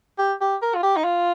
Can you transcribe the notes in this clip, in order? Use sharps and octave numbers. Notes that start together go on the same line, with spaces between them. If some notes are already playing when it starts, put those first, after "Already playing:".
G4
G4
A#4
F4
G4
D#4
F4